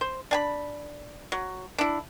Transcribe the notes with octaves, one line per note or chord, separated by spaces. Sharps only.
C5
D4 G#5 B5
F#3
D4 E4